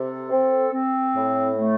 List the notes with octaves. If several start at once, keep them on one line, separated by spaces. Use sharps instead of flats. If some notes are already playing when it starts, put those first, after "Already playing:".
Already playing: C3 A4
C4
C4
A2
A3